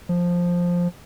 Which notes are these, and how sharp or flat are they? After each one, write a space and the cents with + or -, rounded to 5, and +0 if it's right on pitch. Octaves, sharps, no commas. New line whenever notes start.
F3 +5